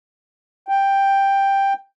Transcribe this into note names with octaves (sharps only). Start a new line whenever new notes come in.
G5